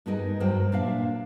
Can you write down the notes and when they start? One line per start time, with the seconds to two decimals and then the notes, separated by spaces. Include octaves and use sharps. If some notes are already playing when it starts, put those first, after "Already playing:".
0.06 G2 G3 B3 D#4 G#4 A#4
0.40 G2 F#3 A#4 C5 G5
0.72 A#2 D4 E5 F5